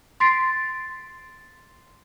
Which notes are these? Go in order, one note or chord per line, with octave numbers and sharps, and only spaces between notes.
C6 A6 B6 C7 D7